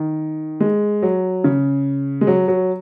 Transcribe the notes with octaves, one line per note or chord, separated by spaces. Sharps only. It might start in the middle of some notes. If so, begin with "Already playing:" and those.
Already playing: D#3
G#3
F#3
C#3
G#3
F#3
F#3